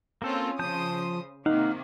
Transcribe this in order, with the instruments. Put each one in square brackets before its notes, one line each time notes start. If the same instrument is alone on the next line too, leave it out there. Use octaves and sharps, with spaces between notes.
[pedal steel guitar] A#3 A4 [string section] C4 C#4 F4
[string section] C#3 C5 D#6 [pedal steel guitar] F3 A5 G6
[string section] C3 D#3 A#3 [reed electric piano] D#4 [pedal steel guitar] F5 F#5